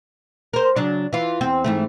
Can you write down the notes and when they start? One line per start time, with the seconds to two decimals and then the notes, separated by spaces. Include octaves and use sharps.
0.53 A#4 C5
0.76 C#3 F#3 D4
1.13 E3 F4
1.41 E2 C4
1.64 G#2 E3 A3